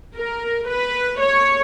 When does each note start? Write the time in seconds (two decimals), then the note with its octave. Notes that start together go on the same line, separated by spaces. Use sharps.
0.15 A#4
0.67 B4
1.19 C#5